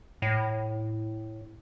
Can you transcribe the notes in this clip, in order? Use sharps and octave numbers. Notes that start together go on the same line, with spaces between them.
A2